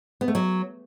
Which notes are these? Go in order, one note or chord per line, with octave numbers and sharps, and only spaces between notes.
B3
A3
F#3